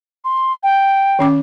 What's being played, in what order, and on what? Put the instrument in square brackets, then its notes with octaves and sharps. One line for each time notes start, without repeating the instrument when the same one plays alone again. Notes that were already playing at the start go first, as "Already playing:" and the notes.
[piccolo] C6
G5
[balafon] D#3 C#4 D6